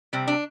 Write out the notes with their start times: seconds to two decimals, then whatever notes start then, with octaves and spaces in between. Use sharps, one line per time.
0.13 C3 G3 C4
0.28 D4